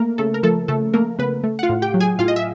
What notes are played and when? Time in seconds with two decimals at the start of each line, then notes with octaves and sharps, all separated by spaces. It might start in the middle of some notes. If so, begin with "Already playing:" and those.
Already playing: A3 A#3 A#4
0.18 C#3 A3 A4
0.34 A#4
0.43 F3 A3 A4
0.68 C#3 A3 A4
0.94 A3 A#3 A#4
1.19 C#3 B3 B4
1.44 A3
1.59 F#5
1.63 F4 F5
1.69 A2
1.82 G4 G5
1.94 F#3
2.00 G#4 G#5
2.19 A2 F4 F5
2.28 D#5
2.36 E5